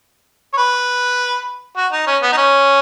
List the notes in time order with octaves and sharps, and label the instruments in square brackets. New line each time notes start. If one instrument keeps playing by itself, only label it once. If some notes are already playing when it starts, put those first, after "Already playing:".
[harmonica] C#5
B4
F#4
D#4
C#4
B3
D#4
C#4